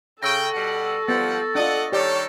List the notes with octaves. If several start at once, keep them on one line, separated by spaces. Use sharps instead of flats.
C#3 A4 G5 C#6 E6 A#6
B2 G3 F#5
F3 G3 B3 F#5 A6
D4 F4 D5 D#5 F#5
D#3 G3 G4 A4 C#5 D5